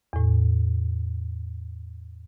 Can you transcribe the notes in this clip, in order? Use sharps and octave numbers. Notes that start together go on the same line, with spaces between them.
E2 A2